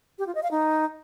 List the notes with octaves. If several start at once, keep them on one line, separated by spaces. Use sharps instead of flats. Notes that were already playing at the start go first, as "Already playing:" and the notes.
G4
F4
D#5
F5
D#4